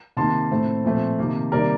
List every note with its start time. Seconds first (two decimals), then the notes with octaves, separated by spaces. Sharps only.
0.17 C3 D#3 A#3 A5 C6
0.51 A2 A3 C4
0.85 A#2 F3 A3 C4
1.19 C3 D#3 A#3
1.52 C3 D#3 G3 A#3 A#4 D5